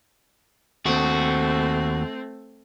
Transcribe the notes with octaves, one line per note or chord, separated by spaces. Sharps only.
D#2 A3 C4 F#4